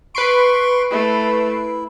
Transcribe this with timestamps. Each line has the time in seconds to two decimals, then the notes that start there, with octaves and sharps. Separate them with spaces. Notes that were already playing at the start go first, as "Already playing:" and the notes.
0.15 B4 C6 C#6 C7 D7
0.91 A3 E4